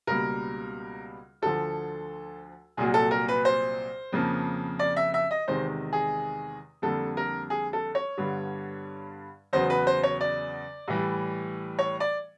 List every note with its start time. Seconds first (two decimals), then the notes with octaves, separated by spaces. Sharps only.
0.07 C#2 B2 G3 A#3 A#4
1.42 D2 D3 F3 A4
2.77 C2 A#2 F#3 A#3 G#4
2.94 A4
3.11 A#4
3.28 B4
3.45 C5
4.12 F2 C#3 F3 A#3
4.79 D5
4.97 E5
5.14 E5
5.31 D#5
5.47 E2 C3 D#3 G#3 C5
5.93 G#4
6.82 F2 D3 G3 A#3 A4
7.17 A#4
7.50 G#4
7.73 A4
7.95 C#5
8.17 G2 D3 G3 B3
9.53 E2 C#3 F#3 B3 C5
9.70 B4
9.87 C5
10.03 C#5
10.21 D5
10.88 A2 E3 G3
11.79 C#5
12.00 D5